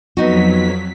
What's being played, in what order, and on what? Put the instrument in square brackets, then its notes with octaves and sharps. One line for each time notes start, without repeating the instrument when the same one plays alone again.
[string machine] F2 F#3 B6 [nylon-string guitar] B3 D#4 F#4